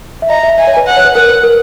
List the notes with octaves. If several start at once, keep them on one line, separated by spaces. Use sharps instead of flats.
E5
D#5 A#5
E5
E5 G#5
C#5
B4
F#5
C#5
B4
A#4 F#5
B4
A#4